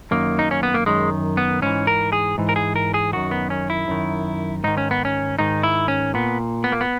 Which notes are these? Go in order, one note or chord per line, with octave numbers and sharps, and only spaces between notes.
F#2 D#3 A#3
D#4
C#4
B3
A#3
F#2 D#3 G#3
B3
G#2 E3 C#4
A#4
G#4
G#2 E3
A#4
G#4
A#4
G#4
F#2 D#3 F#4
B3
C#4
E4
F#2 D#3
G#2 D#3 D#4
C#4
B3
C#4
G#2 D#3 D#4
E4
C#4
A#2 B3
B3
A#3
B3